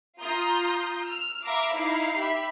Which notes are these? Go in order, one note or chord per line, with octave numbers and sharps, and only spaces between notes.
F4 A#5 D#6 G6
E6 F6
E5 F5 A#5 B5 D6 E6
D#4 E4 F5 C7
G4 E5 B5